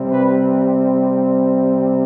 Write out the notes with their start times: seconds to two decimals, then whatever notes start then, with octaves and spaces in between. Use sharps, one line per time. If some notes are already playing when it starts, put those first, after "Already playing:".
Already playing: C3 G3 C4
0.10 B4